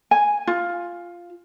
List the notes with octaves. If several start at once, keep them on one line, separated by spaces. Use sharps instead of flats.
G#5
F4